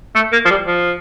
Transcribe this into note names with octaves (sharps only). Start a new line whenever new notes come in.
A3
A#3
F3
G3
F3